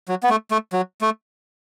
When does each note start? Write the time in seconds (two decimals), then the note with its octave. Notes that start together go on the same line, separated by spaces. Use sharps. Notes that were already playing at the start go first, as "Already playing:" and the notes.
0.08 F#3
0.23 B3
0.30 A3
0.51 A3
0.73 F#3
1.01 A3